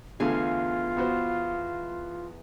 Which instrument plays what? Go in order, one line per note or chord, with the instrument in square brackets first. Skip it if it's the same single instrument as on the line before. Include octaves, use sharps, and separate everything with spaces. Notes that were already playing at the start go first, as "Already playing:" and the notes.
[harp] E2 F5 G#5 [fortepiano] D3 A3 [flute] F4
[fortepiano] B3 F#4 C5